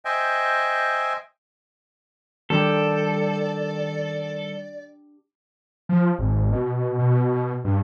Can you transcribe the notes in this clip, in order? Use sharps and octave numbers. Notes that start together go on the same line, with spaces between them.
C5 D#5 E5 G5 G#5
D#3 G3 D4 G4 A4 D5
F3
G#1
B2
B2
G2